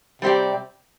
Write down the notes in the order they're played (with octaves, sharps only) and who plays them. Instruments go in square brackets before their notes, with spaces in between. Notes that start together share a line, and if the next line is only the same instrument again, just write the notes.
[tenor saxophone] C3 [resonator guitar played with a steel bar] G3 C4 G4 D5